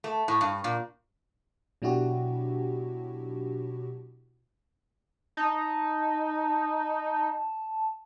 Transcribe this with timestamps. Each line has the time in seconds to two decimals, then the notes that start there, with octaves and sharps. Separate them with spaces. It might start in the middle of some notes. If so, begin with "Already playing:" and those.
0.04 A3
0.28 A2
0.41 G2
0.64 A#2
1.82 B2 F#3 D4 E4 F#4 G4
5.37 D#4 A5